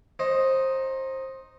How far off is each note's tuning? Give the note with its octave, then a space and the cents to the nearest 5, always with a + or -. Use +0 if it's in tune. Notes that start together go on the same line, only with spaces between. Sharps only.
D#4 +0 C5 +20